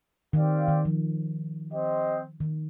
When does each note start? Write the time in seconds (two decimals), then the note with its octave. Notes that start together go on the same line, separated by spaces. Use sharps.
0.33 D#3 C4 G4 D5 F5
0.68 D#3
0.85 F3
1.71 C4 G4 C5 D#5
2.40 D#3